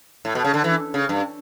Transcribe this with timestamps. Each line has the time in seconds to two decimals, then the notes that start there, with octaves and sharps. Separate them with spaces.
0.25 A2
0.35 B2
0.45 C#3
0.54 D3
0.64 E3
0.94 C#3
1.09 G2